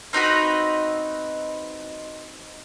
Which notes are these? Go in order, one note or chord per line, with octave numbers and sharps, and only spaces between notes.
C4 D#4 F#4 B4